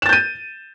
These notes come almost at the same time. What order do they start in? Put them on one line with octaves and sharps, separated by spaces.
E7 A6 G6 D#7